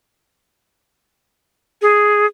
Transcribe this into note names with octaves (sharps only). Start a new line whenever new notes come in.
G#4